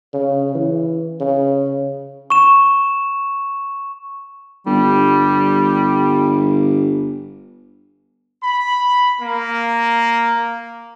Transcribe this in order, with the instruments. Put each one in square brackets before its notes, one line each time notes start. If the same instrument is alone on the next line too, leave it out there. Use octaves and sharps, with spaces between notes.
[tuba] C#3
E3
C#3
[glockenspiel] C#6 E7
[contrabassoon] G1 [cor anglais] G3
[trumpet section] B5
A#3